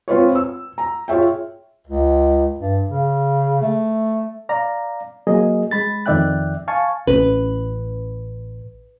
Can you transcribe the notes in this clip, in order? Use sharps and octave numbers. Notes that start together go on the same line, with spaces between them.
C4 F4 B4 C#5
E6
A#5
F4 G#4 C#5 E5 G5
C#2
G2
C#3
A3
D5 F5 A#5
F#3 A#3 G#4 D#5
G#3 B5 A6
F2 D#3 D5 E5 G5 F#6
F5 G#5 A5 C#6
A1 C#4 B4